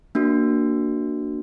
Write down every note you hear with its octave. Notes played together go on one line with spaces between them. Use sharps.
A#3 D4 F#4